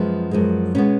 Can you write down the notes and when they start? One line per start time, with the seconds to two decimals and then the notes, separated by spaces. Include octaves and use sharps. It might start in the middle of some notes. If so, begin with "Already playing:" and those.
Already playing: F#2 F3 G#3 B3
0.31 F#2 F3 G#3
0.75 B2 G#3 B3 C#4